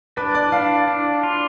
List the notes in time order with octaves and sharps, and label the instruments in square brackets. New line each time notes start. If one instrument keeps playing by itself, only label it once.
[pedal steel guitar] D4 [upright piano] B4
[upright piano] D5
[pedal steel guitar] D4 [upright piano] F5
[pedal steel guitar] D4
F4